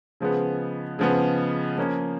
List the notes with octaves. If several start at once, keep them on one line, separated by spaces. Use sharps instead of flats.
C#3 F3 G#3 B3
C#3 F3 G#3 B3
F3 A#3 C#4